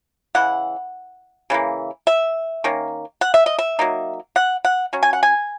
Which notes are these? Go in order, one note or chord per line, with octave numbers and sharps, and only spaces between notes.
C#3 E3 F#5
C#3 E3 A#3
E5
D#3 A#3 C#4
F#5
E5
D#5
E5
F#3 A#3 D#4
F#5
F#5
F#3 C#4
G#5
F#5
G#5